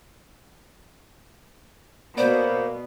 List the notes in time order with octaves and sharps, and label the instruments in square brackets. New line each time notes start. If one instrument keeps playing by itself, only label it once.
[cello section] B2 B3 [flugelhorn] A#3 [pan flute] C5 [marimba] D5